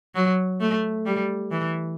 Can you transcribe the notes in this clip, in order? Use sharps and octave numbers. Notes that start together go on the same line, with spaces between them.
F#3
A3
G3
E3